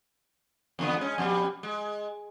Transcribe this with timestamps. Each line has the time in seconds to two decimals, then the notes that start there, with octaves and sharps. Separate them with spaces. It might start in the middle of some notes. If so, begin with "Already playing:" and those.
0.79 E2 D3 B3
0.97 G#3 C#4
1.18 F2 B2 G3
1.63 G#3